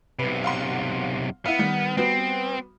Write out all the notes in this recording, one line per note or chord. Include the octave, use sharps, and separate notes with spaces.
B1 C3 B4
F5 F#5 C6
B3 E4 F5
D#3 G3
G3 B3 C4 F#4